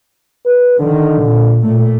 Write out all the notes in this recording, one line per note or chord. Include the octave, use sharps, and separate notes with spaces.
B4
D3 D#3
A#2
A#2 A3